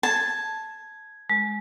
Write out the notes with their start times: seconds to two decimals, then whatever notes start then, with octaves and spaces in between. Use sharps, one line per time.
0.03 A5 G#6
1.30 G#3